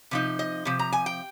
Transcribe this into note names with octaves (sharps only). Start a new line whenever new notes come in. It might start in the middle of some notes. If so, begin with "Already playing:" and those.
C3 F3 D#4
D#5
C3 F3
A#5
G#5
G5